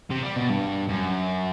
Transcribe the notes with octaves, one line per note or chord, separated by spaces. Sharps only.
C3
G3
B2
G2
F#2